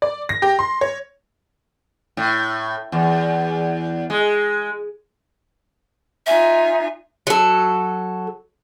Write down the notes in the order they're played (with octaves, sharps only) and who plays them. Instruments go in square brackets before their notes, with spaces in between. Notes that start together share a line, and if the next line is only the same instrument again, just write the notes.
[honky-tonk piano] D5
A#6
G4
C6
C#5
[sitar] A2
E2
G#3
[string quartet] D#4 F4 G#5 [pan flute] E5
[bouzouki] F#3 A4